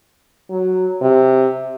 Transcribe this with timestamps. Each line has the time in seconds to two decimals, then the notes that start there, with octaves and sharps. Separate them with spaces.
0.50 F#3
1.02 C3